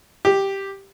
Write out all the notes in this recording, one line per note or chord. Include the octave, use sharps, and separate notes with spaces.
G4